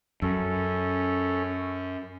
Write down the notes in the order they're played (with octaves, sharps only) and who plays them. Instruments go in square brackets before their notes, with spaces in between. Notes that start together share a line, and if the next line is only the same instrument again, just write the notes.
[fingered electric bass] F#2 [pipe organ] C#4 A4